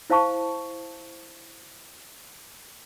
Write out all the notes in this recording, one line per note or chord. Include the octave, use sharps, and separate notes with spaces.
E4 C5 F5 A5 C#6